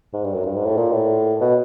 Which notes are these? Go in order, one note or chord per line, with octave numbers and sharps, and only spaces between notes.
G#2
G2
F#2
G2
G#2
A2
A#2
A2
B2